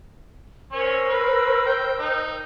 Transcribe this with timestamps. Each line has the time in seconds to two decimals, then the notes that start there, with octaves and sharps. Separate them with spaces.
0.72 C#4 A#4 C5 C#5 E6
1.09 B4
1.66 G5
2.00 D#4